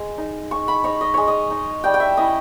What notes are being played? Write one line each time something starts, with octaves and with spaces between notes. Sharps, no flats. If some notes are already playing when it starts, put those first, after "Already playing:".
Already playing: G#3
D#4
G#3 C#6
B5
D#4 C#5
D#5
G#3 C#5
D#5
D#4
G3 G5
G5
E5
C#4 E4 D#5